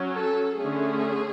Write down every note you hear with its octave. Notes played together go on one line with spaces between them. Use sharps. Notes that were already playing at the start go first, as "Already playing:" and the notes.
Already playing: F#3 C#4
A4
D3 A3 C#4 G#4